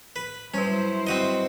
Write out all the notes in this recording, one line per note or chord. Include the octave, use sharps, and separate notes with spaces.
B4
F#3 G3 C#4 E4 B4 C5
C4 F#4 D#5